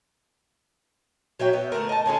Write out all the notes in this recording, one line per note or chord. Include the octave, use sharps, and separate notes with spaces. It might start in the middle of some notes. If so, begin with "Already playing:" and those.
F#3 C#5 E5 G5
B3 E5
D3 A3 F4 A#4
D#5 A5
D3 C#4 G#4 A4